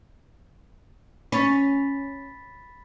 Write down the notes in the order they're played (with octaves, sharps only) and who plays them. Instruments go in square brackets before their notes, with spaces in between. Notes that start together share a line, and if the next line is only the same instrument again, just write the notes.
[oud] C#4 [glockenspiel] B5 A6 B6